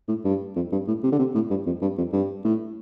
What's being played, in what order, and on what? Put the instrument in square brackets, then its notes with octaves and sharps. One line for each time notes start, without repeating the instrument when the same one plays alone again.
[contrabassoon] A2
G2
F2
G2
A2
C3
D3
C3
A2
G2
F2
G2
F2
G2
A2